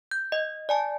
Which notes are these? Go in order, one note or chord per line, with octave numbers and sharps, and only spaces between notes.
G6
D#5
D5 G#5 A5